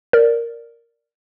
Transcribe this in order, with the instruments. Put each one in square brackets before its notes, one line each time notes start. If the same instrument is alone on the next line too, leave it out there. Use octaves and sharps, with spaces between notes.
[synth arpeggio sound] A#4 D5